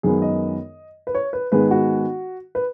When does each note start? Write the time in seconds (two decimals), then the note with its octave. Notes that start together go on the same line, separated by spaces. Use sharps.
0.03 F#2 D#3 G#3 B3 G#4
0.22 D#5
1.07 B4
1.15 C#5
1.33 B4
1.52 G#2 D#3 G#3 B3 B4
1.71 F#4
2.55 B4